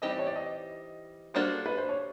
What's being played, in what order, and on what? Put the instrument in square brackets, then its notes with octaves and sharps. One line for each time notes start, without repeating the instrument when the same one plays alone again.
[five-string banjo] E3 G3 C4 D#4 G4 [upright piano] D#5
[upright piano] D5
C#5
D5
D#5
[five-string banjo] G3 A#3 D4 F#4 A4 [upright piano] C5
[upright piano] B4
C5
C#5